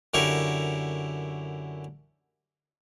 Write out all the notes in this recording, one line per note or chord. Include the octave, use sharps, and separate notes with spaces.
F#2 D3 E4 G4 A#4 C#6